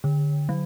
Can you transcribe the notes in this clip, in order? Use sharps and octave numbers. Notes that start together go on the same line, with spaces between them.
D3
F#3